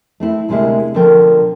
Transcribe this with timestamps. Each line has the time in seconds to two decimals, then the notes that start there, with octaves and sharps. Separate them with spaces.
0.20 A3 C4 E4
0.49 D2 C3 G#3 A#3 E4 D#5
0.94 B2 D3 F3 A4 A#4 G5